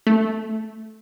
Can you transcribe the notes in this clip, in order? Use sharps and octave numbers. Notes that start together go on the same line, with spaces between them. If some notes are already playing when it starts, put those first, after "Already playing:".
A3